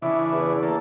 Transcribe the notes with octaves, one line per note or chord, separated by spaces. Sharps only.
C#3 E3 D4 E4
E2
A#3 A4